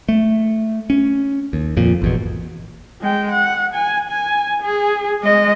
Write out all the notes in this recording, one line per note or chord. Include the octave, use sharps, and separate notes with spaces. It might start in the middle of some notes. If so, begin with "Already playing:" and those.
A3
C#4
D#2
F2 A#2
G#1 E2 B2
G#3 G5
F#5
G#5
G#5
G#4
G#3 D#5